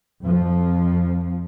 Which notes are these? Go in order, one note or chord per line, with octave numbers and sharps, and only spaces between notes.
F2 F3